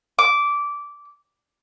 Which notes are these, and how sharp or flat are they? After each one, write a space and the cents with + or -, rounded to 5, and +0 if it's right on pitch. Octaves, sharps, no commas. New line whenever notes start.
D6 -15